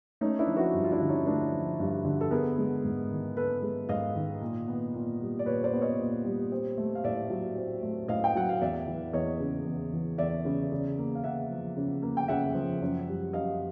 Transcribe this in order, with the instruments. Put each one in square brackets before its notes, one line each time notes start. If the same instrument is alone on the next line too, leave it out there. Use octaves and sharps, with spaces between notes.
[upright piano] A3 C#4 D#4
D4 E4
F3
E4 F#4
G2
F4
D4 E4
D3
C#4 D#4
A3 D4 E4
F3
G2
D3
A4
B3 G#4 A#4
G#3
G#2
D#3
B3 A4 B4
G#3
G#2 D#5 F5
D#3
A#2
B3
A#2
G3
D5
A#2 B4 C#5
C5 D5
B3
C#5 D#5
A#2
G3
C4
A3
F5
A2 D5 E5
F#3
C4
A3
A2 D#5 F5
G5
F#3 F#5
F5
E2 D5 E5
E3
E2 C#5 D#5
C#3
E2
E3
E2 D5 E5
C#3
C#3
A#3
F5
C#3 E5 F#5
F3
C#3
A#3
G5
C#3 E5 F#5
F3
F#2
G3
F#2 D#5 F5